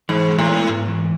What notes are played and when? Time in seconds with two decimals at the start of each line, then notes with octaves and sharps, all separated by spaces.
0.09 G#2 E3
0.29 G#3
0.38 A2
0.48 B3
0.68 G#2
0.88 E3